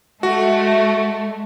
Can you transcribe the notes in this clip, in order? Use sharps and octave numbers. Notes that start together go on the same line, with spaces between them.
G#3 A3 F#4